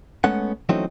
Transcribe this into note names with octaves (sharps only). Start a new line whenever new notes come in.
G#3 A3 B3 C#4 F#5
E3 F#3 A3 C4 C#4 D#4